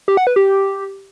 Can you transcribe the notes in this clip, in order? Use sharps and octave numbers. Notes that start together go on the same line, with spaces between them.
G4
F#5
B4
G4